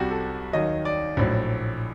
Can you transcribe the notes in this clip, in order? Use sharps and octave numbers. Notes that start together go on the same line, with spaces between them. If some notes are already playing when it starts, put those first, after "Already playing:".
Already playing: C2 C3 G3 F#4
A4
D#2 D#3 F#3 D#5
D5
A#1 A2 F#3